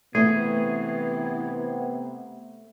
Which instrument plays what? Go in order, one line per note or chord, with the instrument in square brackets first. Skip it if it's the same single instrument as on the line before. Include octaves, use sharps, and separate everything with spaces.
[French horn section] C3 B3 [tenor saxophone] E3 [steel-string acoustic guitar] A3 [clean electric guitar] G#4